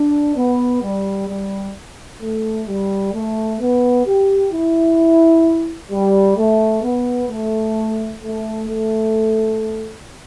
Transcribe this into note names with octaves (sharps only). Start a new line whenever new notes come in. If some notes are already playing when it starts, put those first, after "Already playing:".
Already playing: D4
B3
G3
G3
A3
G3
A3
B3
G4
E4
G3
A3
B3
A3
A3
A3